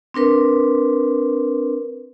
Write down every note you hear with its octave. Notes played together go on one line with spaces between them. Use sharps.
C4 D4 A#4 B4